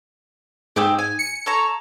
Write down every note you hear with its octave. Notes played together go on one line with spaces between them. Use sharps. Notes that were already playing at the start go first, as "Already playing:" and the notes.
G#2 C4 G4 G#4
G#5
C#7
A4 C#5 A#5